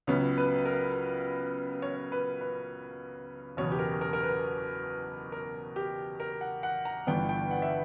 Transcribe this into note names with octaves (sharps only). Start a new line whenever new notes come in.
C#2 C#3 F#3 B3 C#5
B4
A#4
C#5
B4
B4
F#1 E2 B2 C#5
G4
A#4
A#4
A#4
B4
A#4
G4
A#4
F#5
F#5
A#5
G1 G2 E3 B3 G5
G5
F#5
E5